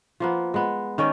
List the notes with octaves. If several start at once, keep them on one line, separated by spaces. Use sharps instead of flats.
F3 A#3 B3
G#3 B3
D#3 C#4 D5 G5